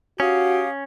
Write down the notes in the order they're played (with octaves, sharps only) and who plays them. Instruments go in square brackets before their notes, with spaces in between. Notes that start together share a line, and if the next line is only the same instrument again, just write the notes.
[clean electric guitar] C#4 [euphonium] F#4 [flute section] G4 F5 D#6